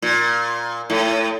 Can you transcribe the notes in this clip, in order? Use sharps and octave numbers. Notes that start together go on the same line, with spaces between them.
A#2
A2